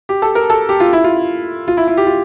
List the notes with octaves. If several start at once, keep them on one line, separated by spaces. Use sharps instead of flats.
G4
A4
A#4
A4
G4
F4
E4
F4
F4
E4
E4
G4
F4